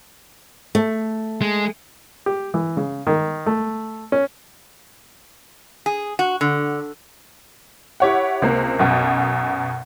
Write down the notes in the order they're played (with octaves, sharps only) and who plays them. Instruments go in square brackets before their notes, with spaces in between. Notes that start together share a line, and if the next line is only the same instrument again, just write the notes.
[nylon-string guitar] A3
[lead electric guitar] G#3
[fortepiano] G4
E3
C#3
D#3
A3
C#4
[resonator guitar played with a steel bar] G#4
F#4
D3
[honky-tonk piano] E4 G4 C#5 F#5
C#2 C3 A#3
B1 F#2 B2